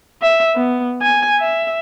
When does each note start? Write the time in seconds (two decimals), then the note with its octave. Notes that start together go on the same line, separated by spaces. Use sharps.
0.22 E5
0.56 B3
1.02 G#5
1.39 E5